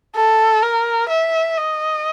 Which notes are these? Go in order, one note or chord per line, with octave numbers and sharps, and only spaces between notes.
A4
A#4
E5
D#5